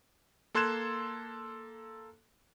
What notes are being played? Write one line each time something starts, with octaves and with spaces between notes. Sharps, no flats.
A#3 A4 C6 F#6 G#6 E7